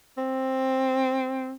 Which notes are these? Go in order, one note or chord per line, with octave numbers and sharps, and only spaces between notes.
C4